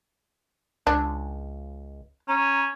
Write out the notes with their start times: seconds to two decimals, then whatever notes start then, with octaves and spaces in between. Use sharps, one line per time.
0.87 C#2 D4
2.28 C#4 A#5